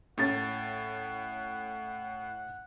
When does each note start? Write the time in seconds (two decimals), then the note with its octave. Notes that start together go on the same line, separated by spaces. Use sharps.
0.18 A2 C#4 C#5 F#5 A6